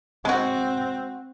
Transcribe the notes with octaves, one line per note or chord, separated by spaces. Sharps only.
G#3 C4 F#4